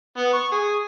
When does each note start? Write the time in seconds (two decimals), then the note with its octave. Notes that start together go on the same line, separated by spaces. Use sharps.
0.17 B3
0.33 C#6
0.52 G#4